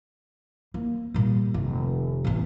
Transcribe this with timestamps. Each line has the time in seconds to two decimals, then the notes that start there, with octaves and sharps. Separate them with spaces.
0.74 A#3
1.14 A#2 G3
1.54 F1 D#3
2.25 A1 E2